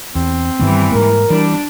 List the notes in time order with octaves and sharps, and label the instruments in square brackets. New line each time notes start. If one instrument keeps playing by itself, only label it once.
[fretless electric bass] E2 [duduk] C4
[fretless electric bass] G2 D#3 B3 [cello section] E3 G3
[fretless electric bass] G#2 G#3 A#3 [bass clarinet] A#4
[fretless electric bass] E3 [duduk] G3 [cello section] D4